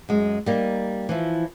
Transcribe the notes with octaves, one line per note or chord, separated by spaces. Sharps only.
F#2 G#3
G3 A#3 D#4
E3 F3 E4